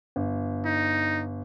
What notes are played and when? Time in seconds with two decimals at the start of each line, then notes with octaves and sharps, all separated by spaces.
0.16 G1
0.65 D#4